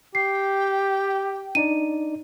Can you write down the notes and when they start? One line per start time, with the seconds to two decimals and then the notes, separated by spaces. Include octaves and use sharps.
0.15 G4 G5 C7
1.55 D4 D#4 D5 D#7